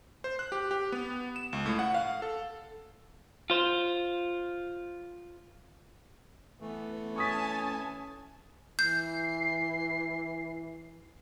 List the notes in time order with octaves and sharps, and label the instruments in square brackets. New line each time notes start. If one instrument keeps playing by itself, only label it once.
[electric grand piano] C5
F#6
G4
G4
B3
E7
C#2
A2
F#5
F5
A4
[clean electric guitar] F4 C5
[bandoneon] E3 A3 [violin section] B3
[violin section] C#4 G#5 A5 [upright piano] C#6 D#6 B6
[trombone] E3 [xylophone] G6 [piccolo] C7